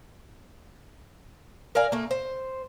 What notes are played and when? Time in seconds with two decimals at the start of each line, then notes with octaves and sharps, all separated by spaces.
1.75 A#4 D5 F5 G#5
1.92 A3 A#3
2.11 C5